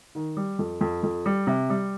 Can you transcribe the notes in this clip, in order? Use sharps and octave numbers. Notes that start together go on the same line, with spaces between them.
D#3
G3
F2
F2
F2
G3
C3
G3